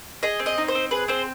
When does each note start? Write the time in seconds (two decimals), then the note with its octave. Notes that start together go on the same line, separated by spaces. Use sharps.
0.23 G#4 D#5
0.39 C4
0.46 D#5
0.58 D#4
0.68 C5
0.75 C4
0.91 G#4 B4
1.08 C4 C5